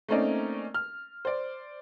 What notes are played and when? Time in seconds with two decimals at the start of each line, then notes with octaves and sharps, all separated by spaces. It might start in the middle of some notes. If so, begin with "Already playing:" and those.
0.09 A3 A#3 C4 C#4 D#4 D5
0.74 F6
1.25 C5 D5